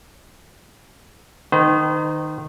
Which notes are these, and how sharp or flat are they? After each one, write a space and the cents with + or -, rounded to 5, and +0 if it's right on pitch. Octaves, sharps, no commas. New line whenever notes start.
D#3 -15 C5 -45